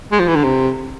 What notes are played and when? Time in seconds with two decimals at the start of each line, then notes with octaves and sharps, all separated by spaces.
0.12 G#3
0.20 F3
0.28 E3
0.36 D3
0.44 C3